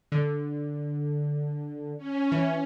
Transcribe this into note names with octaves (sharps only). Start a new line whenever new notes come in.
D3
C#4
E3